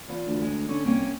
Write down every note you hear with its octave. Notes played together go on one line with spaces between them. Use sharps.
E2 F4
D2
G#3
D3 C#4
C2 A#3 C#4 G5